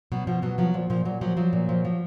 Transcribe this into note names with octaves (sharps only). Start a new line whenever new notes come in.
B2 F#3
B2 F3
B2 F#3
F3 F#3
A#2 F3
A#2 F3
A#2 F#3
F3 F#3
F3 F#3
A#2
F3
F3